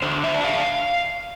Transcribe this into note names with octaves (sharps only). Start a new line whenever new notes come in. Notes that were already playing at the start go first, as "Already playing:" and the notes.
D3 C5
E5
D4
F5